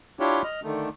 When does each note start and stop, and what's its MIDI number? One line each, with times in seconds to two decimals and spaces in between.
0.20 0.42 62
0.20 0.42 64
0.20 0.42 65
0.20 0.42 67
0.20 0.42 73
0.44 0.60 75
0.44 0.60 89
0.63 0.89 50
0.63 0.89 51
0.63 0.89 57